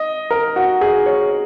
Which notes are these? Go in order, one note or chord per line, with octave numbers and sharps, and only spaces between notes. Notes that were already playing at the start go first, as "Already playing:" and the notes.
Already playing: D#5
A#4
F#4
G#4
C#5